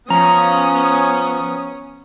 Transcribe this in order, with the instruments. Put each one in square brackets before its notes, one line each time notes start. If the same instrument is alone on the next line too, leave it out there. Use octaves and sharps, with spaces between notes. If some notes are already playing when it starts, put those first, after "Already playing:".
[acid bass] F3 [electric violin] B3 D#6 [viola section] C#4 [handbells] A#5